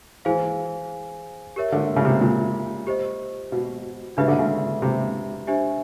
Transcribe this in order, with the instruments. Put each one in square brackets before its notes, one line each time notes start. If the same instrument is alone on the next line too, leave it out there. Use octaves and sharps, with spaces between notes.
[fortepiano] E3 [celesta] G#4 C5 F5 G#5
[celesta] G4 A#4 C#5 E5
[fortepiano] D3
C#3
C3
A#2
[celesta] G4 C5 D#5
[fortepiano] B2
[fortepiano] C#3 [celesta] D4 G4 B4 E5
[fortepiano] D3
C#3
C3
[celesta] D4 G4 C5 E5 G#5